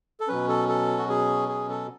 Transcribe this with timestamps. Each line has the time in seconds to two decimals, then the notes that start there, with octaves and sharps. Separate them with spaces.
0.20 A4
0.28 B2 F#3 C#4 B4
0.48 A4
0.69 A4
0.97 F#4
1.09 G#4
1.49 G#4
1.69 A4